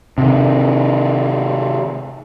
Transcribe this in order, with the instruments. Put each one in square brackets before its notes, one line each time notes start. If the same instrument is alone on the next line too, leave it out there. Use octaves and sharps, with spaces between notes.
[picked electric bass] C3 D#3